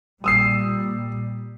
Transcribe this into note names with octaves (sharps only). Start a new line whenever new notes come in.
A#2 G3 D#6 E6 C7